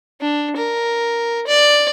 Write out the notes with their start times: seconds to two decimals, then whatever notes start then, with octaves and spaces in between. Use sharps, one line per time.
0.21 D4
0.57 A#4
1.48 D5